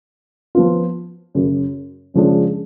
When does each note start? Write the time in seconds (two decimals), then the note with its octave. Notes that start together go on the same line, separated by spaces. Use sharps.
0.55 F3 B3 F4
1.35 F#2 C#3 F#3
2.14 F#2 C#3 F3 G#3 D4